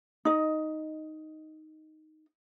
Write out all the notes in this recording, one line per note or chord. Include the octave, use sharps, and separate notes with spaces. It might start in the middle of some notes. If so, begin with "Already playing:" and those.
D#4 D#5